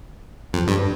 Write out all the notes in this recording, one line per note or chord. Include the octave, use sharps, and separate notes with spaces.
F2
G2